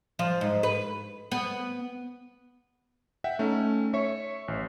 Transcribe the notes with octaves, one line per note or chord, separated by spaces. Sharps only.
F3
G#2
B4
B3
E5 F#5 G5
A3 C#4 D#4
C#5 E5 C#6
A1